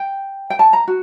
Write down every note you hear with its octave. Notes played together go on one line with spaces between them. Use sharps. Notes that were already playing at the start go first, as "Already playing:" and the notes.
Already playing: G5
G5
A5
A#5
F#4